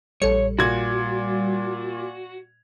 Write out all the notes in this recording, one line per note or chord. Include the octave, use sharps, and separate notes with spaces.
A#1 G3 A4 C#5 C#7
A#2 F#4 G#6